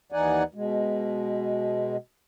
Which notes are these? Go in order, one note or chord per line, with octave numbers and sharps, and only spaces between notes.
D#2 E3 D#4 D5 F#5 G#5
B2 G#3